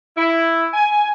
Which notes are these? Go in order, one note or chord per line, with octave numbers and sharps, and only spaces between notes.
E4
G#5